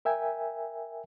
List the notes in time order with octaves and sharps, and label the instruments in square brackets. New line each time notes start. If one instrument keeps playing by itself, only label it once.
[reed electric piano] A#4 E5 G5 G#5